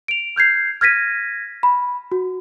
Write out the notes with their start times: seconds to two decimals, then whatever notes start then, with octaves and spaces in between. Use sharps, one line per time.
0.08 D7 F7
0.36 F6 G6 G#6 C7
0.81 F6 G#6 A#6 B6 D#7
1.63 B5
2.12 F#4